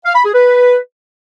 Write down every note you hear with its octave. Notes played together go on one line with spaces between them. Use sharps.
F5
B5
G#4
B4